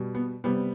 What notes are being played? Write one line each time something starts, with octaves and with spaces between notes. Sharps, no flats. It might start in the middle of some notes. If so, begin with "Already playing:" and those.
Already playing: B2 G3
B3
C3 G3 B3